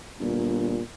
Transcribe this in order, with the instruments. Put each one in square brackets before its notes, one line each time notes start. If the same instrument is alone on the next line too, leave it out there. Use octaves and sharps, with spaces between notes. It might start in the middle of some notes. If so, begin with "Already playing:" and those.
[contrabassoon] G1 [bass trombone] A#2